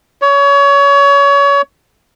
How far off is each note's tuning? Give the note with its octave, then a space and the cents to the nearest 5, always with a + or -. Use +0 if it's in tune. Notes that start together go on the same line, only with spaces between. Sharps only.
C#5 +25